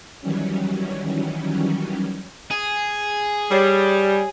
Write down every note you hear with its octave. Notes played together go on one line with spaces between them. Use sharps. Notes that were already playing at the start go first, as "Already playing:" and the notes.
D#3 E3 F#3 G3 C#4
G#4
G3 G4 C#5 C7